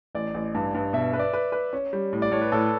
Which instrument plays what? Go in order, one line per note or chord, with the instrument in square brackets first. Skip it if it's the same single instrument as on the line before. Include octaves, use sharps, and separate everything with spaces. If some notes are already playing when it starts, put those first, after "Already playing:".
[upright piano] A1 [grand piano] D5
[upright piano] A1
G2
G2
[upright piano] B2 [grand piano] E5
[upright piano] B4
[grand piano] D5
[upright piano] B4
B4
C#4
G3
A2
[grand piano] D5
[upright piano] A2 [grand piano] C#5
[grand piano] B4
[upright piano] A2 [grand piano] A4